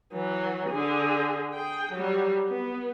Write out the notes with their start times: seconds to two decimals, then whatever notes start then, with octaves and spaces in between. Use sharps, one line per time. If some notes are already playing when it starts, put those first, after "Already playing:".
0.13 E3 F#3
0.70 D3 G#4
1.53 G#4 G5
1.92 F#3 G3
2.48 B3